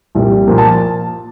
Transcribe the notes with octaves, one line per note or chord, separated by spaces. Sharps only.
C2 A#2 G3
A#2 F3 A#3
A5